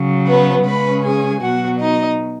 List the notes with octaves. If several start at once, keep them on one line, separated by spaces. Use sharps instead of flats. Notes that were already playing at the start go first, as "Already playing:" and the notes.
Already playing: C#3 F#3
B3 B4
C#3 G#3 C#4 B4 B5
G#4 G#5
B2 F#3 B3 F#4 F#5
D#4 D#5